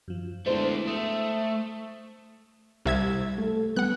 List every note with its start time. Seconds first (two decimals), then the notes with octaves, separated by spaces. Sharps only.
0.08 F#2 F3
0.46 G#3 A3 B3 D4 E4 C5
0.88 A3 D#6 E6
2.85 C2 G3 E5 G#6
3.38 A3 A4
3.76 G3 B3 F#5 F#6